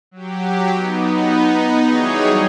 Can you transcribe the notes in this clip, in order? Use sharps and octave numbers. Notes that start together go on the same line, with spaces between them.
F#3 G4
B3 D#4
E3 F#3 G3 D#4 G#4 C#5